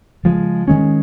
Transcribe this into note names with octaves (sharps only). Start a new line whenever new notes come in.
C#3 F3 G#3
D#3 G#3 C#4